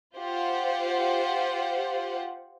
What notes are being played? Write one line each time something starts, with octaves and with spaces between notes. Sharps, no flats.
F4 G4 C5 F#5